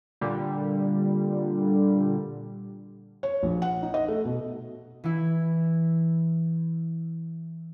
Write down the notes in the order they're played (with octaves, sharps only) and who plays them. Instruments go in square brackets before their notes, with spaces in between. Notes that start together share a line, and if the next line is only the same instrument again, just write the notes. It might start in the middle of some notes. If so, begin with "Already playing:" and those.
[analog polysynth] A#2 D3 G3
[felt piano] C#5
A#1
F#5
D#4
D#5
A3
B2
[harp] E3 E4